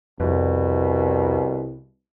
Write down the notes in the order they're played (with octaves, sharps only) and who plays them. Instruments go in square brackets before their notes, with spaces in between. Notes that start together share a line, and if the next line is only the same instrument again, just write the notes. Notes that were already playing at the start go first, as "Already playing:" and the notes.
[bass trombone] C2 [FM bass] F2 [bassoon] B2